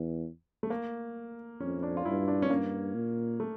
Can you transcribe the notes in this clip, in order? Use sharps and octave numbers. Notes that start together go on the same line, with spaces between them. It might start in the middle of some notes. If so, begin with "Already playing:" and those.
Already playing: E2
A3
A#3
F2 C#4
D4
F4
G2 E4
D4
C#4
G2 A#3
A#2
A3